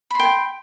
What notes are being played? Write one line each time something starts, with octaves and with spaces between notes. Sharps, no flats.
G5 B5 C6